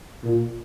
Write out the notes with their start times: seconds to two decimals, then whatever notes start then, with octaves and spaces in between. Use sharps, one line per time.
0.23 A#2